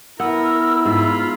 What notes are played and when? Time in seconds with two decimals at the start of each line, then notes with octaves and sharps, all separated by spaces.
0.20 B3 E4 A#4 E6
0.85 G#2 F4 B5